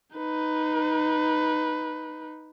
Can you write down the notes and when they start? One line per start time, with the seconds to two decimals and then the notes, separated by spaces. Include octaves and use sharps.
0.16 D#4 B4